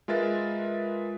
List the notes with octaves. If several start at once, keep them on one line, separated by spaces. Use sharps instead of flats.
G#3 F4 A#4 B4 E5 A6